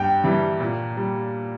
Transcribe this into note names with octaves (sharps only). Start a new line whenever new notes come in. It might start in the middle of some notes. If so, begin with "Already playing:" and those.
Already playing: G2 G5
E3 G3
A#2
G3